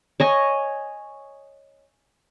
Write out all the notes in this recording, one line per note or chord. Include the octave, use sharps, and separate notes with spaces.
C#5 D#5 G#5